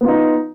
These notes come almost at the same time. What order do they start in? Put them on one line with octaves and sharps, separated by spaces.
B3 F4 D#4